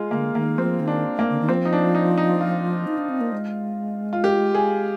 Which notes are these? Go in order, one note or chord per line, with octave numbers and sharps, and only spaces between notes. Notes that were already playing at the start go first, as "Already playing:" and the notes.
Already playing: G#3 F4
D3 A#3
D#3 A#3
F3 C4
D#3
D4
A#3
D3
D#3
F3 C4
D#4
D4
D#4
D#4
F4
D#4
D4
C4
A#3
G#3
F4
G4
G#4